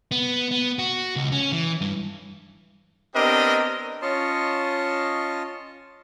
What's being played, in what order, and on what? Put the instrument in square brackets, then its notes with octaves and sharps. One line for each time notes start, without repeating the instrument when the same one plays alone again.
[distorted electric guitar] B3
B3
F#4
C#2
C#4
E3
G2
[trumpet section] B3 C4 D4 G4 A#4 D#5
[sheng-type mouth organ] C#4 F4 C#5 D#5 A5 C6